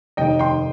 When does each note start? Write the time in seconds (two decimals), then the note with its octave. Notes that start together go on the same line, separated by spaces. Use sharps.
0.17 F1 D#2 D#3 D#5 G5
0.39 G5 C6